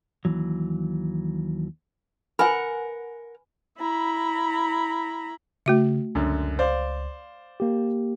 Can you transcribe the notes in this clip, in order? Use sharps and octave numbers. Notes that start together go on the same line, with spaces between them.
D#2 E3 F#3
A#4 B4 F#5 G#5 B5
E4 A#5 B5
C#3 A3 F#4 E5
C#2 F#2 D3
C5 D5 F5
A#3 G4